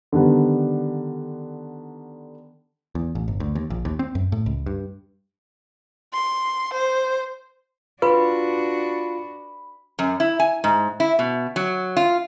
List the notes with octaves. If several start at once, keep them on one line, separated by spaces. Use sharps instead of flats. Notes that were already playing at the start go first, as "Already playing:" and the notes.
D3 D#3 G3 B3
E2
A1
G1
D2
D#2
A#1
D#2
C4
F#2
A2
C#2
G2
C6
C5
D4 F4 F#4 B4 B5
F#2
E4
G#5
G#2
E4
B2
F#3
F4